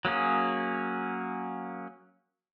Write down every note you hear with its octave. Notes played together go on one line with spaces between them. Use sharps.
F#3 A#3 C#4 G#4